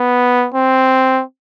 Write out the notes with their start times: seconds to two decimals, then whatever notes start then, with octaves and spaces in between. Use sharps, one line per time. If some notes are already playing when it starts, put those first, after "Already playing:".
Already playing: B3
0.54 C4